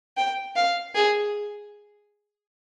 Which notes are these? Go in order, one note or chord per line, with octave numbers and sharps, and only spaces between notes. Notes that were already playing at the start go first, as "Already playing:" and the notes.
G5
F5
G#4